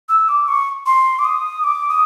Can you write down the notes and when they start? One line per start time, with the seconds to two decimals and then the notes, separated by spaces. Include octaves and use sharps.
0.09 E6
0.29 D6
0.48 C#6
0.86 C6
1.19 D6
1.25 D#6
1.64 D6
1.89 D#6